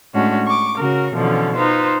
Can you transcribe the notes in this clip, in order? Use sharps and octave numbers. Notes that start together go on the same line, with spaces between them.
A2 G#3 C#4 D4 F#4
C#6 D6
C#3 F#4 A#4
B2 D3 E3 F3 C#4
D#4 F4 B4 C5